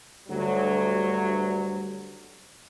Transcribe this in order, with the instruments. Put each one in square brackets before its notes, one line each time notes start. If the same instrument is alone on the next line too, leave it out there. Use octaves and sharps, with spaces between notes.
[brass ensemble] D2 G2 F#3